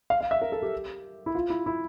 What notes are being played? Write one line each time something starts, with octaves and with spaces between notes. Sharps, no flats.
F5
F5
E5
A#4
A4
G4
E4
F4
E4
E4